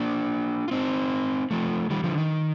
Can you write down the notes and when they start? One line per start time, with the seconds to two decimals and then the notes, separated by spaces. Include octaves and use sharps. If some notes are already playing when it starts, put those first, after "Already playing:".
Already playing: A#3 D4
0.68 F4
0.71 C4 D#4
1.51 F3 A3
1.90 D#3 G3
2.04 D3 F3
2.18 D#3